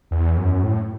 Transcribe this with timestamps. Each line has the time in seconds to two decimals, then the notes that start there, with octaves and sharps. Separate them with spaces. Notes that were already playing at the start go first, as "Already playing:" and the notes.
0.11 E2
0.37 F#2
0.63 A2